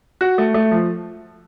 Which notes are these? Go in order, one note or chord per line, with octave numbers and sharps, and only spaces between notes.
F#4
A3
A3
F3